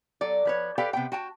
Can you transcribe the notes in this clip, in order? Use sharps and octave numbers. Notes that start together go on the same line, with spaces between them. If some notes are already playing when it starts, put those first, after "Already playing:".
F#3 A4 D5
F3 B4 C#5
G4 A4 B4 D5 F5 G5
C3 B3 G5
F#4 G5 A5